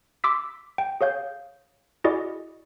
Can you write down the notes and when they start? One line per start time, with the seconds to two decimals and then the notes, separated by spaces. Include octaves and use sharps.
0.24 C6 D6 E6 B6
0.78 G5
1.01 G#4 C#5 F5 G6
2.04 E4 F#4 G#4 D5 D#5